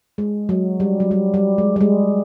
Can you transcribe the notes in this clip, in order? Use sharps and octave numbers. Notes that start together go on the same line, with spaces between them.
G#3
F#3
G3
F#3
G3
G3
G#3
G3
G#3